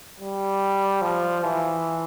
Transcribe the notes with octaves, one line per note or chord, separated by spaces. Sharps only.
G3
F3
E3